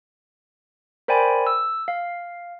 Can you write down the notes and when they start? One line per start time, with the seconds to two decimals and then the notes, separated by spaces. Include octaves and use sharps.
1.08 A#4 C5 D5 G5 G#5 B5
1.47 E6
1.88 F5